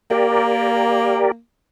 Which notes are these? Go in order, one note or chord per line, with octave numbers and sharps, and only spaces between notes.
A#3 G4 A#4 D5